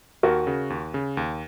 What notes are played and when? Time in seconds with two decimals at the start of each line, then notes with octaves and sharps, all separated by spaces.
0.23 D#2 F#4 A#4
0.47 C#3
0.70 D#2
0.94 C#3
1.17 D#2